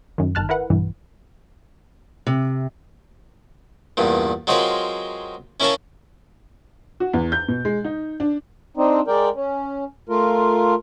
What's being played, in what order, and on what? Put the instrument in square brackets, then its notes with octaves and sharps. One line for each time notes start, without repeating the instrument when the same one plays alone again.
[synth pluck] F#2 D#3
G1 D#3 A5 F6 F#6
E4 A#4 B4 F#5
B1 G2 E3
[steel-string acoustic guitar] C3
[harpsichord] E2 G2 A#2
F#3 G#3 C4 F4 A#4 B4
C#4 E4 A#4 C#5 F5 A5
[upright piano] F#4
E2
G6
B2
G#3
D#4
D4
[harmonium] C4 D4 D#4
G#3 A#4 D5 G5
C#4
A3 F4 A#4